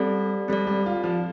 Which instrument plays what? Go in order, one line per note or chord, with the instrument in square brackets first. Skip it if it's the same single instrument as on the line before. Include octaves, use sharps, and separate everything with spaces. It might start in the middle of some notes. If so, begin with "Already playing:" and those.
Already playing: [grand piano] G3 [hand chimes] C4 A4 D5
[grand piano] G3 [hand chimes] C4 A4 D5
[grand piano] G3
F4
F3